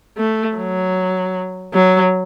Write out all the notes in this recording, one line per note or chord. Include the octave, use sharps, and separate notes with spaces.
A3
F#3
F#3